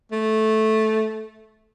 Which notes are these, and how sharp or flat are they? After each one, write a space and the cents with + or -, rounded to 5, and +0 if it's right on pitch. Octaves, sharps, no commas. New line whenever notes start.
A3 -10